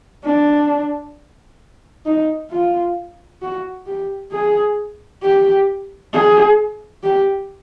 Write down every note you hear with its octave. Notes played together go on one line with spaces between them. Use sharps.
D4
D#4
F4
F#4
G4
G#4
G4
G#4
G4